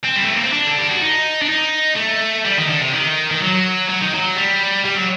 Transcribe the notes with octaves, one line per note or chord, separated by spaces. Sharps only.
C4
G3
A3
A#3
C4
D4
A4
G4
F#4
D#4
D4
D#4
A3
G3
D#3
D3
C3
D#3
D#3
F#3
F#3
D#3
F#3
G3
G3
F#3